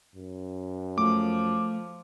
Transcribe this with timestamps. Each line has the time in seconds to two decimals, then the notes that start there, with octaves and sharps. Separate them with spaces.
0.16 F#2
0.98 F3 A3 D6